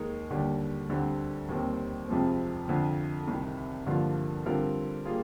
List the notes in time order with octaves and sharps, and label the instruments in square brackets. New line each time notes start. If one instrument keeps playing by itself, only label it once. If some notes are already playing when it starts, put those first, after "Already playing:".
Already playing: [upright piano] D#2 D#3 G#3 D#4 A#4
D#2 D3 G3
D2 D3 G3 C4
D#2 D#3 G3 C4
F2 C3 F3 G#3 C4
F2 D3 F3
C2 C3 D#3
G2 D3 F3 A#3 F4
D3 G3 C4 F4 A#4
G3 A#3 F4 G#4